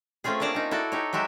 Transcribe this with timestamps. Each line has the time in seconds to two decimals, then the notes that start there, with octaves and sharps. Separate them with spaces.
0.24 A3 C4 C#4 F4 G#4
0.40 A#3 D4 D5 A5 A#5
0.55 C#4 D#4
0.71 E4 F#4 A4 D5
0.92 D#4 G4 C#5
1.13 F#3 G#3 F#4 G4 E5